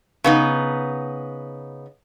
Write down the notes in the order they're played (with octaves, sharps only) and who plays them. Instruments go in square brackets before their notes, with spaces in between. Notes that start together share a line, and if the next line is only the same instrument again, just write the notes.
[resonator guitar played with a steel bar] C#3 B3 D#4